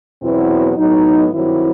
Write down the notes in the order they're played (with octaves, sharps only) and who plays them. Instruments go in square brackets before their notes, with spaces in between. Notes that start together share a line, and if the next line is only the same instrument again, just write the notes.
[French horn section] E2 B2 F#3 B3 C4 E4
A2 F#3 B3 D#4
G2 D#3 F#3 C4 E4